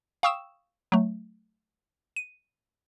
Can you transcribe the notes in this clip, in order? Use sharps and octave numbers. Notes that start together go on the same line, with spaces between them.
F5 G5 C#6 D#6 E6 E7
F#3 A3
D#7